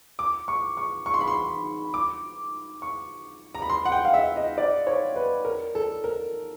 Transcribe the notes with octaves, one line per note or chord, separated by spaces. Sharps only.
D6
C#6
C#6
C#6
C6
B5
C6
D6
C#6
A#5
B5
C6
F#5
G5
F5
E5
D#5
D5
C#5
B4
A#4
A4
A#4